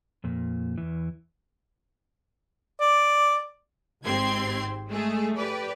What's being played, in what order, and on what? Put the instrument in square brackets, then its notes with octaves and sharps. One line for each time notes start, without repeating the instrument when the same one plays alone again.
[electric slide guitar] F2 A#2
E2 E3
[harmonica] D5
[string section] G#1 G#2 C4 G4 C6 G#6
G#3 A3 G#4
G4 B4 D5